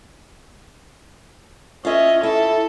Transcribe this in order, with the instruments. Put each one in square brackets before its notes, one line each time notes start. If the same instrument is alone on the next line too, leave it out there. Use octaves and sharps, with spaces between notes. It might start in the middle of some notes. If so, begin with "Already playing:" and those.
[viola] C#4 D#5 [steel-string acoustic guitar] F4 E5
[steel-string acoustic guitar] E4 [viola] A4